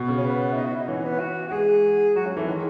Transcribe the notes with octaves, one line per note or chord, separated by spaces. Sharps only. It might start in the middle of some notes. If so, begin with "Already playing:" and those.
Already playing: B2
C#3
C#4
B3
E4
D#4
F#4
E4
D#4
E3 C#4
B3
F#4
F#4
G#3 G#4
F#3 F#4
F#3 C#4
E3 A3
D#3 G#3